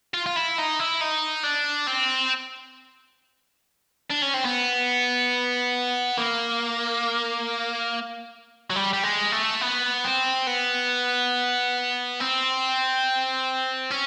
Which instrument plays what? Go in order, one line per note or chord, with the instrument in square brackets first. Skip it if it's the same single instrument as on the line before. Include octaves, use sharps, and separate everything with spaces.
[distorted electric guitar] F4
F4
E4
D#4
E4
D#4
D4
C4
D4
C#4
C4
B3
A#3
F#3
G3
G3
G#3
A3
B3
C4
B3
C4
C#4